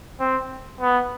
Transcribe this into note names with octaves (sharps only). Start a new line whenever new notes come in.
C4
B3